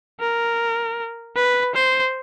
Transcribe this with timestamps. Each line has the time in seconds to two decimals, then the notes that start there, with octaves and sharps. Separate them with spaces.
0.20 A#4
1.36 B4
1.75 C5